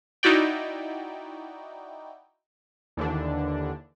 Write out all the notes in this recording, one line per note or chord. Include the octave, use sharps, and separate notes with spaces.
D#4 E4 F#4 D5 G5
D#2 D3 E3 D4